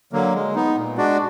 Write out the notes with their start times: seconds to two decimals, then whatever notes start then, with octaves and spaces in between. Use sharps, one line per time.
0.13 D3 F#3 A#3
0.35 G#3
0.55 B3 D#4
0.76 A#2
0.96 G#3 D4 F#4 D5